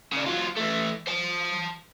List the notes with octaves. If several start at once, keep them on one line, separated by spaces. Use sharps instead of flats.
C#3 D4
F#3 F4
E3 A3
C5 A5